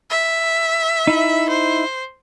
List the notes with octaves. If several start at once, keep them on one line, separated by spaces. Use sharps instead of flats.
E5
D#4 E4
C5